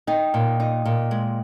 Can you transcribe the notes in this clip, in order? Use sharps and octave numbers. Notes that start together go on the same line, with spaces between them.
D#4 D#5 G5
A#2
D#4
A#2
G#3